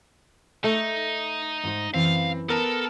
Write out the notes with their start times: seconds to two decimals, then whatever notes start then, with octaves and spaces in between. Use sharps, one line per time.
0.64 A3 D#4
1.64 G#2 A4 C5
1.94 F#2 E3 C4 F5
2.49 B3 A4 A#4 A5